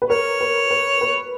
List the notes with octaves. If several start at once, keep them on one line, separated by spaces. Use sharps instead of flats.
B4
A#4 C#5
B4
B4
B4